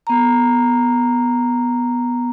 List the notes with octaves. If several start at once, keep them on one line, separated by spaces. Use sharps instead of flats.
B3 A#5